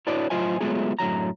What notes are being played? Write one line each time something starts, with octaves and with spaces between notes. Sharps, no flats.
D4 E4 F#4 B4 C#5 D5
A2 F#3 F4 C5 D#5 G#5
F#3 G#3 A3 B3 F4 G#4
F#2 A2 D3 F#3 A#5